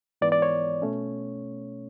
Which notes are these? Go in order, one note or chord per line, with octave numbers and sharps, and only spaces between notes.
G#2 E3 B3 D5
D5
C#5
B2 A3 C#4